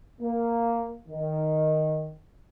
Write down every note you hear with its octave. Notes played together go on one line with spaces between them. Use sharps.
A#3
D#3